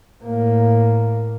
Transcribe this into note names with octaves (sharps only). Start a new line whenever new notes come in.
A2 A#3